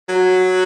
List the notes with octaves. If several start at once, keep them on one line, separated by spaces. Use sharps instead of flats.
F#3